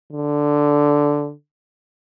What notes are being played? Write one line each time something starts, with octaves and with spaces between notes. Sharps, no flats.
D3